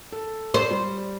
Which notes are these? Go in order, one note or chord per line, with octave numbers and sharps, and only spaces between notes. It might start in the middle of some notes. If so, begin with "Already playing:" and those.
A4
C5
G3